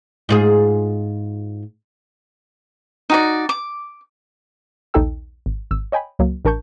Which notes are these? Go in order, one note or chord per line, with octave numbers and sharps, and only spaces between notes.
G#2 F4 G#4
D#4 F#4 D5
D6
A#1 D#2 D#4 A4 G5 E6
G#1
G#1 E6
C#5 D#5 G5 G#5 B5
C#2 F#3 A#3
A1 D4 A#4 A5 C#6 G6